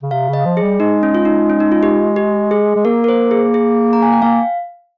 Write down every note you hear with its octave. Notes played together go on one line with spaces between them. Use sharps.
C#3
C3 F5
C#3
D#5
F3
G#4
G3
G#3 D#4
C#4
F4
D#4
C#4
D#4
F4
G4
G4
G#4
G#3
A#3 A#4
A#4
C5
G#4
G#4
A#5
G#5
G5
A#3 F5